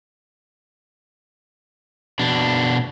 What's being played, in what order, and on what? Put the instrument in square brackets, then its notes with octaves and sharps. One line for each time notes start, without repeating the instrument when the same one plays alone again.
[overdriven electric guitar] B2 D4